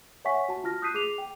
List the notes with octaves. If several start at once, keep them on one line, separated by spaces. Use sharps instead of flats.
C#5 E5 F#5 G#5 C#6 B6
F#4 A5
F4 A5 F6 A#6
D#6 F#6 G6 B6 C7 D#7
G#4 D6 C7 F7
G5